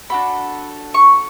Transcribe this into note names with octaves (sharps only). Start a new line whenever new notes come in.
D4 F#4 A4 B5
C#6